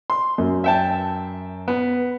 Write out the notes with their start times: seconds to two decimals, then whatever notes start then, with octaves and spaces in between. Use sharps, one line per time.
0.10 C6
0.38 F#2
0.64 E5 G5 A5
1.68 B3